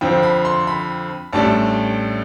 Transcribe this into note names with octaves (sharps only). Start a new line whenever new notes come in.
F2 D3 F3 C4 G5
B5
C6
B5
A1 A2 G3 D4 A5